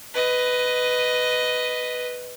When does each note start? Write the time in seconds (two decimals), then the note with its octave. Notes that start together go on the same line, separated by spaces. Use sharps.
0.14 B4 D#5